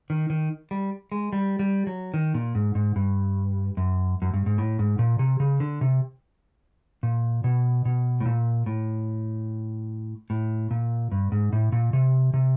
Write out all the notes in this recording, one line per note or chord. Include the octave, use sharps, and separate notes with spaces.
D#3
D#3
G3
G#3
G3
G3
F#3
D#3
A#2
G#2
G#2
G2
F#2
F#2
G2
G#2
A2
G#2
A#2
C3
C#3
D3
C3
A#2
B2
B2
A2
A#2
A2
A2
A#2
G2
G#2
A2
A#2
C3
C3